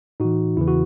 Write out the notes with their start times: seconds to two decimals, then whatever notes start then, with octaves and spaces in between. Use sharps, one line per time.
0.20 A2 E3 D#4 F#4
0.56 E2 C#3 E3 E4
0.68 F#4